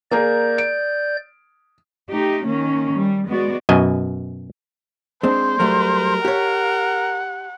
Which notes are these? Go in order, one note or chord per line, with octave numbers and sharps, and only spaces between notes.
A#3 G#4 A#4 D5 G6
D7
A3 D#4 G4
D#3 A#3 C#4
G3
G#3 B3 F#4 D5
F#2 B2 D#5 G#5
G#3 C4 D4 C5
F#3 G3 A3 A#4
G4 C#5 F#5